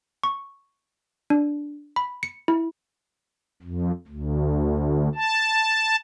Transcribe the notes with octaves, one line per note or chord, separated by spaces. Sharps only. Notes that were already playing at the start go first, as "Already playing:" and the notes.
C#6
D4
B5
C#7
E4
F2
D2
A5